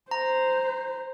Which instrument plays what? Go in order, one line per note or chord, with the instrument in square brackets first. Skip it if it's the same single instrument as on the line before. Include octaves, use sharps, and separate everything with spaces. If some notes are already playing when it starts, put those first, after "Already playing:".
[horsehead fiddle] C5 [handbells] A#5